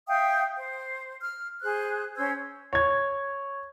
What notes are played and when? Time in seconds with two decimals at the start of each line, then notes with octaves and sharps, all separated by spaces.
0.07 E5 F5 G5 D#6
0.55 C5
1.22 F6
1.62 G#4 C5 F#6
2.16 C#4 C5 E6 G#6
2.73 C#5 G#6